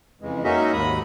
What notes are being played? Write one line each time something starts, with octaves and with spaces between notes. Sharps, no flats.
F2 C#3 E3 G#3
A#3 C#4 D#4 F#4 D#5 E5
D#2 G#2 G#3 B5 D#6